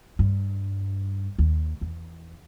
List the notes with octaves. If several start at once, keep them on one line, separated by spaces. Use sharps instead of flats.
G2
D#2
E2